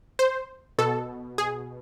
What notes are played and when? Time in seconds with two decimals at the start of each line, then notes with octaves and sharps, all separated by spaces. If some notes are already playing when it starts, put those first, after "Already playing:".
0.19 C5
0.78 B2 A4
1.38 G#4